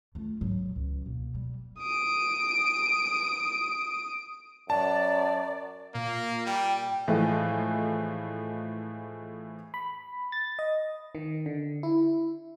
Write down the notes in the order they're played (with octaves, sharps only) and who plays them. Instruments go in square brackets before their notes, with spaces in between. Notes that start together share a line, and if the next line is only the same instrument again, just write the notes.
[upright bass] A3 F4
G#2 F#3
C#2
B2 A#3
G3
[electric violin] D#6 D7
[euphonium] F#2 [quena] D5 [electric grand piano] A5
[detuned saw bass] A#2 [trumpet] A#3
[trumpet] G3 [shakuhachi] G5
[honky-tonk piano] A2 E3 F3 G#3 A3
[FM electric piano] B5
A6
D#5
D#3
D3
E4